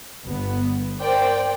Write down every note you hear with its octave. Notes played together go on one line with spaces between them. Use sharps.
G1 B3
A#4 C5 D5 G5